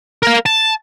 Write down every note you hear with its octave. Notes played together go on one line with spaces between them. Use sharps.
A#4 F5
A5